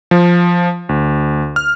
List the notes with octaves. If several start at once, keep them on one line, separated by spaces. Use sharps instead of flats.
F3
D2
F6